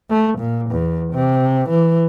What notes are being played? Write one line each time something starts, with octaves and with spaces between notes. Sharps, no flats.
A3
A#2
E2
C3
E3